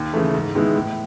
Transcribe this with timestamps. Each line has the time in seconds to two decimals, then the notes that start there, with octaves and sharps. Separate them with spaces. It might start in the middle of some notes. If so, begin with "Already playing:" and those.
Already playing: D#2
0.14 C#3 E3 A3
0.34 G#2
0.55 D#3 G#3 B3 E4
0.75 A2